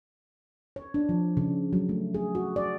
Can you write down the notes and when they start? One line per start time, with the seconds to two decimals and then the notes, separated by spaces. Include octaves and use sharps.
0.76 C#5
0.94 D4
1.09 F3
1.37 C#3
1.73 F#3
1.89 A3
2.14 G#4
2.35 F#4
2.56 D5